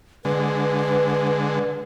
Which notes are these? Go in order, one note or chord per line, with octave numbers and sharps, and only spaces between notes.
D3 G#3 B4